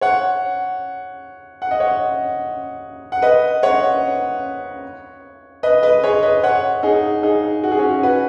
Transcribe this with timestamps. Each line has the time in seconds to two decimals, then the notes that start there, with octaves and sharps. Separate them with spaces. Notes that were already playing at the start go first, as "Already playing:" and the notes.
0.01 C#5 F#5
1.62 F#5
1.71 D#5
1.80 C#5 F#5
3.12 F#5
3.22 B4 D#5
3.63 C#5 F#5
5.63 B4 D#5
5.83 B4 D#5
6.04 G#4 C#5
6.23 B4 D#5
6.43 C#5 F#5
6.83 D#4 G#4
7.23 D#4 G#4
7.63 F#4
7.72 G#4
7.78 C#4 F#4
8.03 F#4 B4